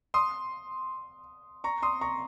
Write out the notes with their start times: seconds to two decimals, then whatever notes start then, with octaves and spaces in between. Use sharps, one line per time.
0.14 C6 D#6
1.64 A#5 C#6
1.83 C6 D#6
2.01 A#5 C#6